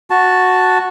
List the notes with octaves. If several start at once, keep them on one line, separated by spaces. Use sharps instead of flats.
F#4 A5